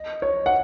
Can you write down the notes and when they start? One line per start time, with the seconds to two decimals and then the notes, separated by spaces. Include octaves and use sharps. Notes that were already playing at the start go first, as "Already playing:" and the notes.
Already playing: D#5
0.22 C#5
0.46 F#5